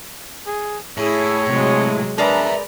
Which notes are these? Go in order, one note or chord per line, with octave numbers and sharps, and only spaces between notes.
G#4
A2 E4 G#4 C#5
C3 F#3 G#3
G#3 D4 G#4 A#4 B4 D5 E5 A#5